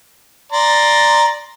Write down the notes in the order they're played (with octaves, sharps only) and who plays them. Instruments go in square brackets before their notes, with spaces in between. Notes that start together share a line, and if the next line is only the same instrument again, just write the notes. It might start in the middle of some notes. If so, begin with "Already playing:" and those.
[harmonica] D5 A#5 C6